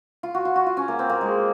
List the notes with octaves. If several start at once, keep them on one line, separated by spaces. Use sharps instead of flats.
F4
F#4
F4
F#4
F4
C#4
A#3
C4
A#3
G#3